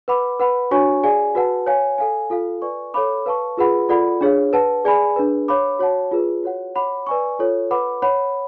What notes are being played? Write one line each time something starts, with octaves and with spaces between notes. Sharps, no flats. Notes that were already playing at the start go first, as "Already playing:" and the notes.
B4 F#5 B5 D6
B4 F#5 B5
D4 F#4 C#5 G#5 C#6
G#4 D5 F5 G#5
F#4 B4 F#5 A5
C#5 F5 G#5
A4 F5 G#5
F4 A4 F5
B4 D5 G#5 C#6
A4 C#5 F5 B5 D6
B4 F5 A5 C#6
F4 G#4 B4 F#5 B5
F4 A4 D5 F#5 B5
D4 G#4 C#5 F5
B4 F#5 A5
G#4 D5 G#5 B5
D4 G#4 B4
C#5 F5 B5 D6
F#4 C#5 F#5 A5
F4 G#4 B4
F#4 C#5 F#5
C#5 F#5 B5 D6
B4 D5 G#5 C#6
F4 A4 C#5
B4 F#5 B5 D6
C#5 F#5 B5